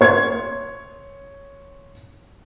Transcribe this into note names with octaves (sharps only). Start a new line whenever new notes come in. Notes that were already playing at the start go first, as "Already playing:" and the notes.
C#5 C6 G#6